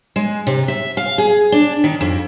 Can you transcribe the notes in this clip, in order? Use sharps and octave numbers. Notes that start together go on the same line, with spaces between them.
G#3
C3
E5
F5
G#4
D4
D#3
F2